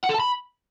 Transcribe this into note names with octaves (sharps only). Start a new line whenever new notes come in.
F#5
A4
A5
B5